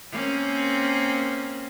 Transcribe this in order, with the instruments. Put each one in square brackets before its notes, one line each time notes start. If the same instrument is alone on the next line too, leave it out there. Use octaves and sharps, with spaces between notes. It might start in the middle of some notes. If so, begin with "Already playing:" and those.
[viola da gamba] A#3 C4 C#4